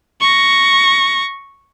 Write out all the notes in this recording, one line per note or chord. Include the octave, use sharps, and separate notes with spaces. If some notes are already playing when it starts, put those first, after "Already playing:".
C#6 A#6